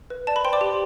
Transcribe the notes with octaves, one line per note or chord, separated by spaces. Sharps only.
B4
D5 A5
B4 B5
C5 G5 C6
D5 D6
G4